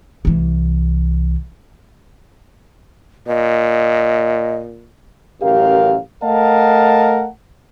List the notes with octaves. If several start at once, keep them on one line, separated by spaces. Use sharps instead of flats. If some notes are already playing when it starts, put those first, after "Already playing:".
C2 E3
A#2 D#5
A1 F#2 G4 A#4 F5
A3 A#4 D#5 F5 F#5 A5